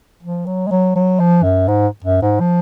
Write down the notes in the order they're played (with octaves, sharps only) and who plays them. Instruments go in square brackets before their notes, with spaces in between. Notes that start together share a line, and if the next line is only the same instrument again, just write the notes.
[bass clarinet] F3
F#3
G#3
F#3
F#3
F3
F#2
G#2
F#2
G#2
F3